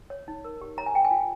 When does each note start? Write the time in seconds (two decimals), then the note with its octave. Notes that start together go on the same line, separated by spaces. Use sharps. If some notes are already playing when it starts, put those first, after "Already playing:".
0.10 C#5
0.28 D#4
0.45 A#4
0.61 G4
0.78 C#5 A#5
0.86 G#5
0.94 G#4 G5
1.05 G#5
1.11 F4